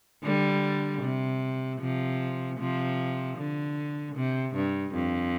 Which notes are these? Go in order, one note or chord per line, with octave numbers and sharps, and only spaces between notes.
D3 G3
C3
C3 F3
C3 F3
D3
C3
G2
F2